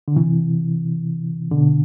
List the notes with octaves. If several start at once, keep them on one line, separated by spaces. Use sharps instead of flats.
D3
C3 E3
B2 D3